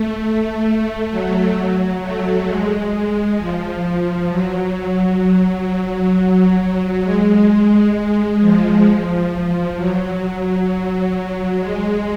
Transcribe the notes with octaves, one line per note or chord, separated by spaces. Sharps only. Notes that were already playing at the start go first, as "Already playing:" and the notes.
Already playing: A3
F#3
A3
G#3
F3
F#3
F#3
G#3
G#3
F3
F3
F#3
F#3
G#3